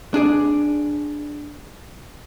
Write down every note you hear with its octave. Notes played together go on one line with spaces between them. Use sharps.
D4 G#4 D5